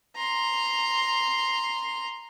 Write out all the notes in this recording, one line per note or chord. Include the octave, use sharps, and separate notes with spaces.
A#5 C6